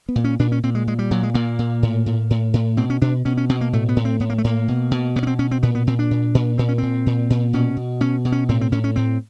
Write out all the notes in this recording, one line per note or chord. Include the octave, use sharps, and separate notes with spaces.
B3
A#2
C#4
A#2 D4
C#4
A#2 C4
G#3
A#2 G#3
G3
A#2 F#3
G#3
A#2 A#3
A#2
A2
A2
A2
A2
B2 C4
C#4
B2 D4
B2 C#4
C#4
B2 C4
A#3
A2 A3
B3
A2
C4
A2 B3
A#3
A3
A2 A#3
B2
B2
B2 B3
C#4
C4
B2 C#4
C4
A#2 B3
B3
A#2 C4
D4
A#2
A#2
A#2 C4
C#4
A#2 C4
A#2
A#2
B2 C#4
B2
B2 C#4
B2
C#4
A2 C4
C4
A2 C#4
C#4
A2 C4